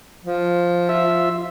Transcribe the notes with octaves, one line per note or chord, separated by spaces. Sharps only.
F3
F4 E5